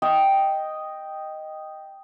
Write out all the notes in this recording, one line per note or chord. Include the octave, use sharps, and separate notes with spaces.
D#5 G5